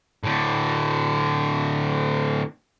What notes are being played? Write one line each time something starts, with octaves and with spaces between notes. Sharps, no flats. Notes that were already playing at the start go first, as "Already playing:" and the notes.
A2 D3